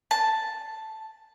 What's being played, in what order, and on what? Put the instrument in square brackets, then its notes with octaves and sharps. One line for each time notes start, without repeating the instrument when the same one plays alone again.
[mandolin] A5